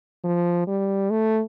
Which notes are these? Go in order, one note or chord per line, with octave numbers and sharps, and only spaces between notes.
F3
G3
A3